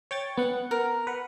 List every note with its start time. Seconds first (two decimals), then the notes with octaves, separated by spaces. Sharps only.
0.11 C#5 G5 A6
0.37 B3 F#5
0.71 A#4
1.07 B4 F#5